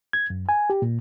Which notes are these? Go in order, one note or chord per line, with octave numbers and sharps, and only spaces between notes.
G#6
F#2
G#5
G4
A#2